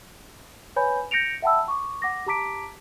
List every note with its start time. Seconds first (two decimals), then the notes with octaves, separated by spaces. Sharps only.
0.76 B4 C#5 G#5 B5 G6
1.11 G6 A#6 C#7 D7 F7
1.42 E5 F#5 G5 A5 B5 E6
1.68 C#6 D6
2.02 F#5 D6 A#6
2.26 G4 A5 A#5 D6 B6 D7